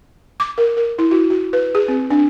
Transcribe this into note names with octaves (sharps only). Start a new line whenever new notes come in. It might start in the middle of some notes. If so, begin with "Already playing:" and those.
D6
A#4
A#4
E4
F#4
F#4
B4
G#4
C4
D4